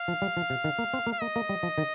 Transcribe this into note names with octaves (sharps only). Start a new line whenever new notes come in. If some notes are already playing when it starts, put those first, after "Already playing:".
Already playing: F5
F3
G3
F3
C3
D#3
A#3
C4
A#3
F5
A#3 D#5
A#3
G3
F3
D#3